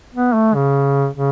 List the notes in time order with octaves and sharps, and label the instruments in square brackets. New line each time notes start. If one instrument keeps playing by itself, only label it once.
[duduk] B3
A3
C#3
C#3